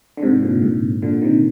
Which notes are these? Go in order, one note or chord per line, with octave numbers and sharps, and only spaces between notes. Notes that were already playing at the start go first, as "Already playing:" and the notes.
D3
G#2 C3
A#2 D3
G#2 C3
A#2 D3
C3 D#3